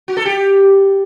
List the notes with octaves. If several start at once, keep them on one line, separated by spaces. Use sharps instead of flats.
F#4
A4
G4